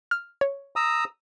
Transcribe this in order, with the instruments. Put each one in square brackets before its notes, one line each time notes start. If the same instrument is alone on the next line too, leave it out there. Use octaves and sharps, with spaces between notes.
[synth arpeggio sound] F6
C#5
[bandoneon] A#5 D#6 E6